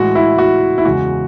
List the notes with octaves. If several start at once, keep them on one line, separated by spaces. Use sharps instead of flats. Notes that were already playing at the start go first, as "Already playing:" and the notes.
Already playing: A2 E3 G#3 F#4
E4
F#4
E4
E2 C#3 G#3 F#4